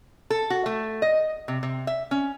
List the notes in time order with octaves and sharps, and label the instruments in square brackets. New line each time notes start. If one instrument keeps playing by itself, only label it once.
[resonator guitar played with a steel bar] A4
F#4
A3
D#5
C3
C3
E5
C#4